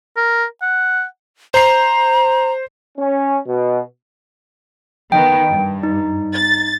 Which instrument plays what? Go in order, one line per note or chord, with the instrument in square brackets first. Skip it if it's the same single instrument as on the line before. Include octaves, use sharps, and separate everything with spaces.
[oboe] A#4
F#5
[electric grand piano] C5 C7 [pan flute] A#5
[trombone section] C#4
B2
[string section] D#3 B3 [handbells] G5
[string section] G2
[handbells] D#4
[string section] A6